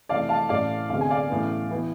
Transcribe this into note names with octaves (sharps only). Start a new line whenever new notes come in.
F2 C3 E3 A3 D5 F5
F5 A5
A1 A2 E3 D5 F5
D2 C3 G#3 B3 F5
G#5
D5 F5
A1 A2 E3 B3
E3 B3